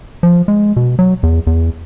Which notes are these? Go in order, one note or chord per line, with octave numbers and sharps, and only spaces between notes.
F3
G#3
B2
F#3
E2
E2